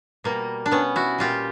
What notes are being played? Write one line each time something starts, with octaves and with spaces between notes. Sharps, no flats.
B2 G3 A#3
D4
B3 C#4
E4 F#4
A#2 G3 F4 G4